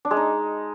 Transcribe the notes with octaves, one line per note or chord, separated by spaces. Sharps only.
D4
G#3
D#4